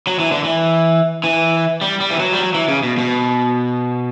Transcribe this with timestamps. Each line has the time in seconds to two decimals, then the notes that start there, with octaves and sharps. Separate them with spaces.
0.07 F#3
0.19 E3
0.32 D3
0.44 E3
1.24 E3
1.81 G3
2.00 G3
2.10 E3
2.20 F#3
2.33 G3
2.39 F#3
2.54 E3
2.68 C#3
2.83 B2
2.98 B2